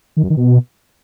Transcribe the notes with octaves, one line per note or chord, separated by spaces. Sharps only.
D#3
F#2
D#3
B2